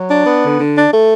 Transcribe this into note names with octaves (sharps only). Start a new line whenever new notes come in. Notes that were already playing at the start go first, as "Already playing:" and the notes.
Already playing: F#3
D4
B3
D3
D3
D4
A3